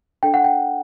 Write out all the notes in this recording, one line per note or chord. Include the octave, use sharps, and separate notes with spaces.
D4 A4 D5 G5
F#5
G5